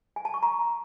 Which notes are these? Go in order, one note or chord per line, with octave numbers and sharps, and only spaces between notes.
G#5
A5
C#6
A#5